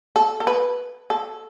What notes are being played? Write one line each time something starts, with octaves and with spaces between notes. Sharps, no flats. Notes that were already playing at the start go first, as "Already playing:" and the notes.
A4
A4
B4
A4